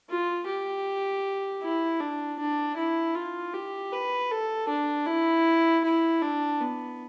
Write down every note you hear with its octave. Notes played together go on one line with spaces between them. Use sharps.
F4
G4
E4
D4
D4
E4
F4
G4
B4
A4
D4
E4
E4
D4
B3